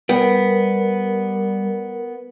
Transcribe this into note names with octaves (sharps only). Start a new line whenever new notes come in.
G3 B3 A#4 G5